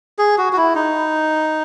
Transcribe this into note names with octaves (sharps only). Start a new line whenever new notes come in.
G#4
F#4
F#4
E4
D#4